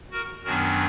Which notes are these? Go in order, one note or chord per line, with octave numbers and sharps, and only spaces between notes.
F#4 A#4
F#2 D#3 F#3 B3 D4 F#4 A#4